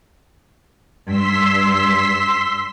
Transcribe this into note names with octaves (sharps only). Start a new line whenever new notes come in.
G2 C6 E6 B6